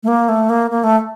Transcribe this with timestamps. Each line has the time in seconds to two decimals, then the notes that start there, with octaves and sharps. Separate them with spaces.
0.03 A3
0.08 A#3
0.29 A3
0.50 A#3
0.71 A#3
0.84 A3